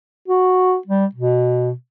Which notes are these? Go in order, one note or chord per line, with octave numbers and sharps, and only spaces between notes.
F#4
G3
B2